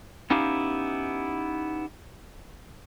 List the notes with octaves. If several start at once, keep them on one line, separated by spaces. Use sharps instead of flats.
B3 C#4 D#4 E4 G4 F5